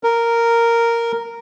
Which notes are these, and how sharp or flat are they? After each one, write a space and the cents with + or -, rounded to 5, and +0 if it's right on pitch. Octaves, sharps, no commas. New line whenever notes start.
A#4 -5